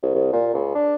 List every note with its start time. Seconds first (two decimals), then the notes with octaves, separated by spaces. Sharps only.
0.03 C2
0.14 C2
0.33 A#2
0.54 C#2
0.75 D4